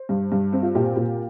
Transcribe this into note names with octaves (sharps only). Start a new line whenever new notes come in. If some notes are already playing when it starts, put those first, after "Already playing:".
Already playing: C5
G2
G2
C4
F4
A#2 G4
A#2